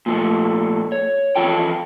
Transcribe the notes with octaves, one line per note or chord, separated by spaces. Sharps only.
A#2 F3 A3
C#5
E3 F3 F4 A4 G5